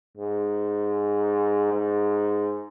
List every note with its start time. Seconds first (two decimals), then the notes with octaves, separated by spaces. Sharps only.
0.17 G#2
1.73 G#2